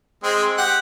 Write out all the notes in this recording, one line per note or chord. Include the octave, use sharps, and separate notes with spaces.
G#3 C4
G4 F#5